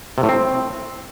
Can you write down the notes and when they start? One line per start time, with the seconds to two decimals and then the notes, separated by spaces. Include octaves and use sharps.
0.18 C3
0.23 A2
0.29 C4